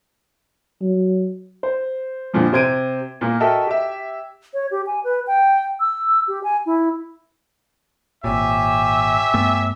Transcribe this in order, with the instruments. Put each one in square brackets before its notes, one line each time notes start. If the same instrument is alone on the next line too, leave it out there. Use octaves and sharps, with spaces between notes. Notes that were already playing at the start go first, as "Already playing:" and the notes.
[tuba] F#3
[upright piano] C5
F2 A#2 D3 F3
C3 C5 G#6 D7 D#7
A#2 A#3
F#4 A4 A#4 D#5 E5 G5
G4 E5
[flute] C#5
G4
G#5
B4
G5
E6
G4
G#5
E4
[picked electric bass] G#1 A#2 [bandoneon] G4 C#5 G#5 [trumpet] E5
[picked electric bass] G2 A3 B3